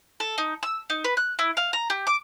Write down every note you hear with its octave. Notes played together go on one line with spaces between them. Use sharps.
A4
D#4
E6
D#4
B4
F#6
E4
F5
A#5
G4
D6